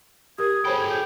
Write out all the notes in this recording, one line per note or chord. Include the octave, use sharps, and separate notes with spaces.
G4 A#4 D#6 G#6
G#4 A4 C5 C#5 G5 B5
G6